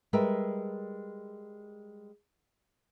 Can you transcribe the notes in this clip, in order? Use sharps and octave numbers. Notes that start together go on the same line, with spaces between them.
G3 G#3 A#4 B4 E5